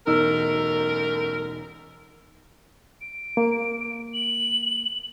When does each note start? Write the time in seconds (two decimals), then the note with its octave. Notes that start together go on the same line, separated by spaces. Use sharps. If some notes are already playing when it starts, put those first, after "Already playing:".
0.07 E1 F#2 A3 D#4 A#4 E6
3.01 D7
3.37 A#3
4.14 F#7